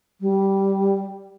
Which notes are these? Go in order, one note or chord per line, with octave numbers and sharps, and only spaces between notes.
G3